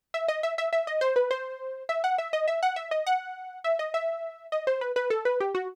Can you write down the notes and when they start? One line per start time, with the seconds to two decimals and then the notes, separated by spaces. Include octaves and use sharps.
0.14 E5
0.28 D#5
0.43 E5
0.58 E5
0.73 E5
0.87 D#5
1.01 C5
1.16 B4
1.31 C5
1.89 E5
2.04 F#5
2.18 E5
2.33 D#5
2.48 E5
2.63 F#5
2.76 E5
2.91 D#5
3.06 F#5
3.64 E5
3.79 D#5
3.94 E5
4.52 D#5
4.67 C5
4.81 B4
4.96 B4
5.10 A4
5.25 B4
5.40 G4
5.55 F#4